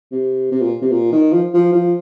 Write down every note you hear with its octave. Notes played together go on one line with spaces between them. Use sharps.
C3
C3
A#2
C3
A#2
D#3
F3
F3
F3